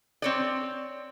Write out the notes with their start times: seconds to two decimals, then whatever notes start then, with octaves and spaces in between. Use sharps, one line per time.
0.22 C4 C#5 D5